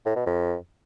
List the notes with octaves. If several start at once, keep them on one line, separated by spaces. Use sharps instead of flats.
A2
B2
F2